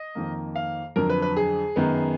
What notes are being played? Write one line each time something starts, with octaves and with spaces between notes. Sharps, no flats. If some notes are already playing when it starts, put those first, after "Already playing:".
Already playing: D#5
F2 D#3 A#3
F5
F2 D3 F#3 A#4
B4
B4
G#4
F#2 D#3 G#3 B3